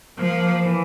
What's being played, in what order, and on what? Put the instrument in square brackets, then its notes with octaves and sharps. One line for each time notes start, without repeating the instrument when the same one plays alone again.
[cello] F3 [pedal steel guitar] A#3
[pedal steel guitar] E3